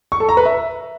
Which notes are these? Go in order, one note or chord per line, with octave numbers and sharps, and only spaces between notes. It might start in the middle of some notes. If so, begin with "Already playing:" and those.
C#6
A4
A#5
B4
E5